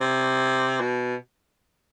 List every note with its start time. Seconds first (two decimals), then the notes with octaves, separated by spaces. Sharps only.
0.01 C3
0.81 B2